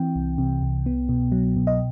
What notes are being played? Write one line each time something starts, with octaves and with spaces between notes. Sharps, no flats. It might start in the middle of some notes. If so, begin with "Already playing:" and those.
Already playing: E3 C4 G5
C2
C3
C2
B3
B2
F#3
B2
D#5